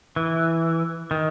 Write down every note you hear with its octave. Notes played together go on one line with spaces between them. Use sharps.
E3
D#3